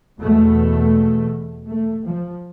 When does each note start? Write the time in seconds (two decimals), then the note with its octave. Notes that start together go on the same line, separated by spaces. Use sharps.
0.22 E2 B2 A3
1.69 A3
2.06 F3